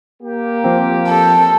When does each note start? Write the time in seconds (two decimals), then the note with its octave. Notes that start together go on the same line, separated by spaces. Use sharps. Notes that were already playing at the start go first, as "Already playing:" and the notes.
0.23 A#3 G4
0.64 F3 C4
1.08 A4